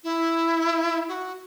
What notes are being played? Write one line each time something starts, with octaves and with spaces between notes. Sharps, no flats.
E4
F#4